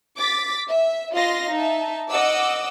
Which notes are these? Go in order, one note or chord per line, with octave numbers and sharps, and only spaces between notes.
D6 A6 B6
E5
F4 D#5 F5 C6 A#6
D#4 E5 A5
D#5 F#5 D6 E6